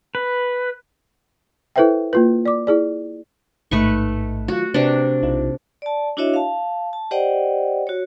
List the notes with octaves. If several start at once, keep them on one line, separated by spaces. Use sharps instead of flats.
B4
E4 A4 B4 C5 E5 G5
A#3 F4 B4
D5 D6
E4 G#4 D5
A1 G#2 A3 D#4 B4 C#6
D#3 F#3 F4 F#4
C3 D4 B4 D5
B1 D#4 F4
D5 A5
D4 E4 F#4 C#5 D#5 E5
F5 A5
A5
G4 C5 D5 D#5 F#5 G5
F#4 C#5